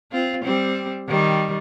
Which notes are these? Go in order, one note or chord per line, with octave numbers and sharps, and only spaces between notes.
C4 F4
G3 C4
D#3 G3